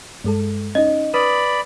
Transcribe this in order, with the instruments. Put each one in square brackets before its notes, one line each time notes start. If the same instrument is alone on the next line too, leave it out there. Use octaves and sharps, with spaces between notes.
[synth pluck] G2 G#3 A4
[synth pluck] C#4 D#4 [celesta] D#5
[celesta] B4 [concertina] D5 B5 [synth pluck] D#6